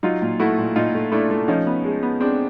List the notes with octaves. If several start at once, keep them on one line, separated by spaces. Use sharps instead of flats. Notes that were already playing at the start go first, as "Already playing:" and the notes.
F#3 D#4 F4
A#2
A3 E4 F#4
A#2
A#2 D#4 F4
A3
A3 D4 E4
A3
F3 C#4 D#4
B3
G#3
B3
G#3 C4 D4